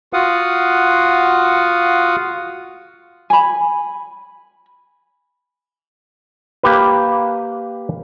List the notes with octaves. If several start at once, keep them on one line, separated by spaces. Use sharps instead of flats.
F4 F#4 F5 F#5 D#6
G#5 B5
A#3 G4 B4